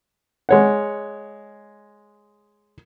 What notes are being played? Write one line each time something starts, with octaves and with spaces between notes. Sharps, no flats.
G#3 C#5 F#5